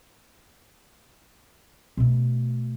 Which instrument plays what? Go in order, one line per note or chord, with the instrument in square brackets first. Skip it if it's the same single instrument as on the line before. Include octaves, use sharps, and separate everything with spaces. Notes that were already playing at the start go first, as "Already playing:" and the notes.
[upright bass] B2 A3